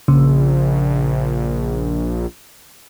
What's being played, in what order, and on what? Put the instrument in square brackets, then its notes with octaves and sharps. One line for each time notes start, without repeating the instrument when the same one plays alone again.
[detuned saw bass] A#1 [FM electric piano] C#3